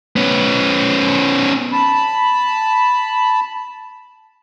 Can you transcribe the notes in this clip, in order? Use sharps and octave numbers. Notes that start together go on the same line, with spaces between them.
B3 C#4
A5 B5